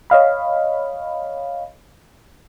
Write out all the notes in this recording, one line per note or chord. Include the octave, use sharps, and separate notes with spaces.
C#5 D#5 F5 B5